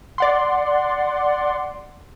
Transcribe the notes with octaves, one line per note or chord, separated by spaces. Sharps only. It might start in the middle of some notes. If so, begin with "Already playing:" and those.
D5 F#5 C6